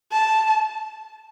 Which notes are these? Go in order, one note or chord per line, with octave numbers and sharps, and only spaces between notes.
A5